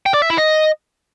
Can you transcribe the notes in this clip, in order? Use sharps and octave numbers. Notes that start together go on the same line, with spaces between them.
G5
D5
E5
E4
D#5